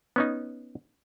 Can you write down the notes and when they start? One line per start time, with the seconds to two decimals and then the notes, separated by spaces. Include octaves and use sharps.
0.16 B3 C#4 D#4